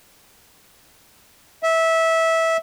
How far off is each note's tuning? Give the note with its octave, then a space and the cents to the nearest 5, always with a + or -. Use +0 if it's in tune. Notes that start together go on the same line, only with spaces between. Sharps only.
E5 -15